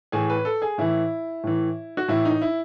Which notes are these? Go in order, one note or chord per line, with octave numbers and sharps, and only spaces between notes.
A2 E3 G#4
B4
A4
G#4
A2 E3 E4
A2 E3
F#4
A2 E3 E4
D#4
E4